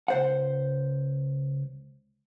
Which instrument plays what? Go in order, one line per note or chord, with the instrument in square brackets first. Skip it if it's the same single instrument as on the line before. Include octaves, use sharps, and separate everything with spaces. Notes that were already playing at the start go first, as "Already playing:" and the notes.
[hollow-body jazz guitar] C#2 C5 F#5